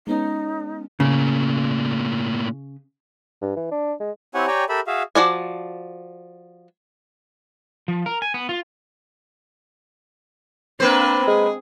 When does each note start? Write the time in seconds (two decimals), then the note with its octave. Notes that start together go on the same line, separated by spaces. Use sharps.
0.07 G#3 B3 C#4 D#4
1.00 A2 C#3 A#3
3.42 G2
3.56 E3
3.71 D4
4.00 G#3
4.34 C4 E4 G4 C#5 F#5 G#5
4.47 G4 C#5 D5 G5 G#5 A#5
4.69 G4 A4 A#4 E5 B5
4.87 F#4 G#4 E5 F5
5.15 F3 F#4 D5 G#5
7.88 F3
8.06 A#4
8.22 G#5
8.34 B3
8.49 F4
10.80 A#3 C4 D4 B4 C5
11.27 G#3 G#4